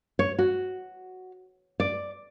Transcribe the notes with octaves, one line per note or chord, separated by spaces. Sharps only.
C#5
F#4
D5